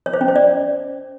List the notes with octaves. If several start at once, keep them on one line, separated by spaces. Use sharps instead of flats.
C#5
C5
C#4
C5
D5